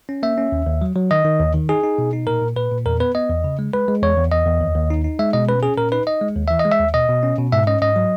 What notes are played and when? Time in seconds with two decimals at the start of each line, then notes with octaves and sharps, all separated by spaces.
0.09 C#4
0.23 A#3 E5
0.38 C#4
0.52 D#2
0.67 D#2
0.82 F#3
0.96 F#3
1.11 D#3 D#5
1.25 D#3
1.40 D#2
1.54 D#3
1.69 D#4 G#4
1.83 D#4
1.98 B2
2.13 D#4
2.27 A#2 A#4
2.42 A#2
2.56 A#2 B4
2.71 A#2
2.86 E2 A#4
3.00 B3 B4
3.15 B3 D#5
3.29 E2
3.44 C#3
3.59 G#3
3.73 G#3 B4
3.88 G#3
4.03 E2 C#5
4.17 E2
4.32 E2 D#5
4.46 E2
4.61 D#2
4.75 D#2
4.90 D#4
5.04 D#4
5.19 G#3 E5
5.33 B2 D#5
5.49 C#4 B4
5.63 C#4 G#4
5.77 A#2 A#4
5.92 D#4 B4
6.07 D#4 D#5
6.21 G#3
6.36 D#2
6.48 E3 E5
6.59 D#5
6.65 G#3
6.72 E5
6.80 D#2
6.94 B2 D#5
7.09 B2
7.23 C#4
7.38 B2
7.52 G#2 E5
7.67 C#4 D#5
7.82 G#2 D#5
7.96 F#3